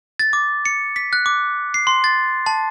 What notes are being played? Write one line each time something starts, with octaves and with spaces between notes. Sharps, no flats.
A6
D6
C#7
B6
F#6
D6
C7
C6
A6
A5